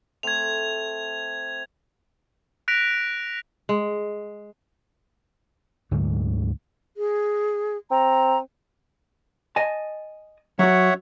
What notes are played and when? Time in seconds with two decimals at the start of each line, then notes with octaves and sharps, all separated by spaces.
0.23 A3 C4 G#6 F7
2.68 F#6 A#6 B6 D7 F7
3.69 G#3
5.91 D2 G#2 D3 F#3
6.97 G#4
7.91 C4 A#5
9.56 D#5 G#5 A5
10.59 F#3 F#4 C#5 E5 F#5